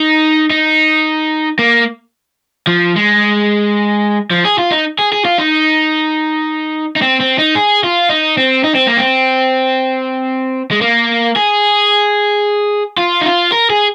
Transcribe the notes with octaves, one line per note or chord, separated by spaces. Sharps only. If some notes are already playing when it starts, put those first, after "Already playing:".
Already playing: D#4
D#4
A#3
F3
G#3
F3
G#4
F4
D#4
G#4
G#4
F4
D#4
D#4
C4
C4
D#4
G#4
F4
D#4
C4
D#4
C4
A#3
C4
G#3
A#3
G#4
F4
D#4
F4
A#4
G#4